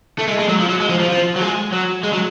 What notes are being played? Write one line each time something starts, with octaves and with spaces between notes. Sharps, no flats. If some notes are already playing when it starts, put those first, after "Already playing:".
A3
G#3
G#3
F#3
F3
F#3
G#3
F3
F3
F3
F#3
G#3
F#3
G#3
F#3